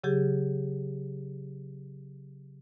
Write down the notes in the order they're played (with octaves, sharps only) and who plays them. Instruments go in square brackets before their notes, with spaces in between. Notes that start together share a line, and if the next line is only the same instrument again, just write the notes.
[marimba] C#3 F#3 G4 G#4